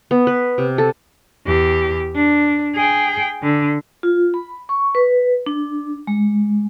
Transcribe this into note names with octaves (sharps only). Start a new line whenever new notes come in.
B3
B4
C3
A4
E2 G4
D4
G#4 G5
D3
F4
B5
C#6
B4
D4
G#3